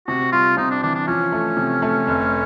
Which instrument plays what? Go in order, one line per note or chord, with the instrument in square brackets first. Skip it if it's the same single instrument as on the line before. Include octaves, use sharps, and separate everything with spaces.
[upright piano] C3 [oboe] F#4
[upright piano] G3 [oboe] F4
[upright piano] C3 [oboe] D#4
[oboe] D4
[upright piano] E3 [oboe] D4
[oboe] D4
[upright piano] F3 [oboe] C#4
[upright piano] A3
C3
A3
F1